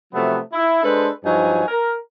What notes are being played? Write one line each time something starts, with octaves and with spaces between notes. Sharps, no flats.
C3 F3 F#3 A3 B3
E4
G#3 D4 A4 B4 C5
G2 F3 F#3 D#4 G#5
A#4